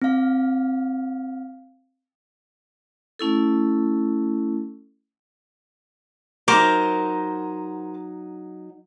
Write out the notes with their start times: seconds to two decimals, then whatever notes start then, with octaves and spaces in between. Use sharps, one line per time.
0.02 C4 F5
3.19 A3 C#4 E4 A4
6.48 F#3 D#4 A#4 C5 D6